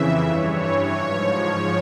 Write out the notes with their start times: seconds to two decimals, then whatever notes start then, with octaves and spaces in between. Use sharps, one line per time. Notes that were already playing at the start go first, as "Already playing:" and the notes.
Already playing: F2 C#3 E3 E5
0.24 G2 E3 C#5
0.60 C#5
0.96 G#2 F3
1.31 C#5